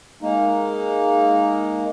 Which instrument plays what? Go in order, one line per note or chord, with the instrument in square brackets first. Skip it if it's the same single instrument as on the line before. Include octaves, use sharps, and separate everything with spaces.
[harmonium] G#3 A#3 D#4